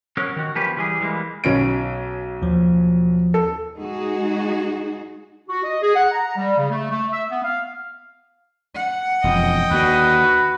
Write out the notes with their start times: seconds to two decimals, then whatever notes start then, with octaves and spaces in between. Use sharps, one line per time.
0.17 F#3 C#4 A#4
0.36 D#3 F#4
0.55 F3 A#3 C#4 G4 B4
0.77 E3 G3 G#4
1.01 E3 G3 G#3 A#3
1.44 B1 C#4 D7
2.42 D#2 F3
3.34 A4
3.77 G#3 D#4 F#4 G#4
5.49 F#4
5.63 D#5
5.82 G#4
5.95 F#5
6.12 A#5
6.36 G3
6.57 C#3
6.70 A3
6.90 A3
7.12 E5
7.29 B3
7.43 F5
8.75 F#5
9.24 E1 F2 D#5 G5
9.71 D#2 D3 F#4 B4